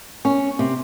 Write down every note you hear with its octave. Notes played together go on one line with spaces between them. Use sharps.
C#4
C3